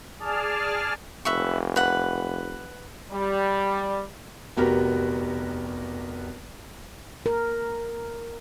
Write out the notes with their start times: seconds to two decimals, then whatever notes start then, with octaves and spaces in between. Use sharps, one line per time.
0.19 G#4 D5 A5 F6
1.25 F1 B4 E5 C#6
1.76 B4 F#5
3.11 G3
4.57 F1 B3 F#4 G4 A#4
7.26 A#4